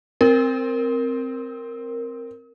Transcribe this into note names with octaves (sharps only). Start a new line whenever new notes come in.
C4 A#4